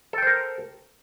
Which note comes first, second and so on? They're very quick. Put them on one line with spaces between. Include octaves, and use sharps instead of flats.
A4 G5 C5 A#4